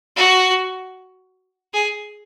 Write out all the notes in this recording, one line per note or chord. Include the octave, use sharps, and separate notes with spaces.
F#4
G#4